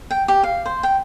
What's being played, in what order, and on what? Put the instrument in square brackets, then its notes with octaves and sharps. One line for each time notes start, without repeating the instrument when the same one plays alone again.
[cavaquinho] G5
G4
F5
C5
G5